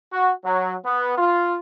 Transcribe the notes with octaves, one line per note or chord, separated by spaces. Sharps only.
F#4
F#3
B3
F4